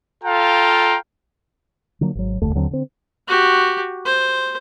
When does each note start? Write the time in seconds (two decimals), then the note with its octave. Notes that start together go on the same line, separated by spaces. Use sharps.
0.24 F4 A4 F5 G5 A#5
2.01 D3 F3 F#3 A#3
2.15 G#1 F#3
2.42 F1 D#2 D3 A3
2.55 D#2 D3 F#3 C4
2.71 D3 C4
3.29 F#4 G4
4.06 C5